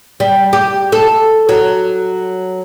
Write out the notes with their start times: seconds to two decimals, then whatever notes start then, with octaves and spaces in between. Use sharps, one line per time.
0.20 G3
0.53 G4
0.92 A4
1.49 F#3